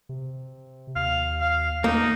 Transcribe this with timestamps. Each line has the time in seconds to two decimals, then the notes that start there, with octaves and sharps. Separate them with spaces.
0.09 C3
0.96 D#2 F5
1.40 F5
1.84 E2 A#3 D#4